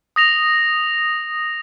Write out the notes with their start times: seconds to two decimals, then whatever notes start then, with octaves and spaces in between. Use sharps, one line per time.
0.16 D#6 A#6 F7